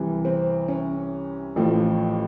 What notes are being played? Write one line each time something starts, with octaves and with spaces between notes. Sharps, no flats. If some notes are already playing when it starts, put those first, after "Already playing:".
Already playing: C2 C3 E3
C4
C#4
A1 A2 F3